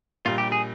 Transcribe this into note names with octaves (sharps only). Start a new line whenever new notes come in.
A#1 A#2 G3 F4
G4
G#4